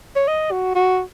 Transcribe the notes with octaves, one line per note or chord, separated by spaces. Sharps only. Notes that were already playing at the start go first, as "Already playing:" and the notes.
C#5
D#5
F#4
F#4